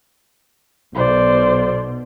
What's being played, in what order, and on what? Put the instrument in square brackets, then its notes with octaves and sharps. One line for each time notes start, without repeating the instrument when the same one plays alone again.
[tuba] B1 [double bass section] B2 [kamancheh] C5 D5